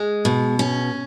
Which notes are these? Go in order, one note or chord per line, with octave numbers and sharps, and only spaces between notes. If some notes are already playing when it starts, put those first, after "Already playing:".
Already playing: G#3
B2
C#4